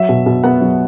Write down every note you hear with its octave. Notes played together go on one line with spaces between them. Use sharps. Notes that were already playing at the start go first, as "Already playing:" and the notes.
Already playing: F#3 E5
B2
B2
B3 F#5
F#3